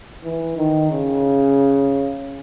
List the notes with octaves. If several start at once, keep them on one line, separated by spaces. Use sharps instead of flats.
E3
D#3
C#3